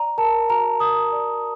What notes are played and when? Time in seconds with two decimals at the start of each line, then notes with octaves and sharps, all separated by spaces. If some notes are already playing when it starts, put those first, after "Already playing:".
Already playing: D5 A#5
0.18 A#4 A5
0.50 F#4 A#5
0.80 A#4 D#6
1.12 D5